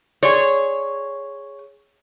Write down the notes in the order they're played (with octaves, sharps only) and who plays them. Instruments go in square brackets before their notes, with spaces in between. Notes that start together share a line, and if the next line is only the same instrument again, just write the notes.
[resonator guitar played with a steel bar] G#4 C#5 [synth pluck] D5 C6 C#6